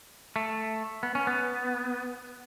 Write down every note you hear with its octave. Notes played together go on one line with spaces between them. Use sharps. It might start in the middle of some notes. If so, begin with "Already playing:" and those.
A3
B3
C#4
B3